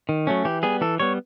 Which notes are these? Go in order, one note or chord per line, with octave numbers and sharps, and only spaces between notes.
D#3
F#3 A3 C#4
E3 G4
G3 B3 G#4
E3 A4
G3 B3 C#5